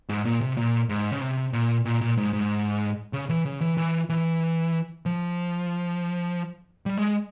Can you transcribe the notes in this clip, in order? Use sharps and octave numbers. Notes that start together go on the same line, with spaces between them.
G#2
A#2
C3
A#2
G#2
C#3
C3
A#2
A#2
A#2
G#2
G#2
C#3
E3
C#3
E3
E3
E3
F3
G3
G#3